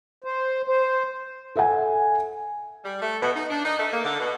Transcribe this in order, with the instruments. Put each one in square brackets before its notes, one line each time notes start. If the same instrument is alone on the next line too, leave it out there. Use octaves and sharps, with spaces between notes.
[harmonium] C5
C5
[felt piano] A4 E5 F#5 G#5
[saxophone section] G3
A3
B2
D#4
D4
D#4
A3
A#3
D3
B2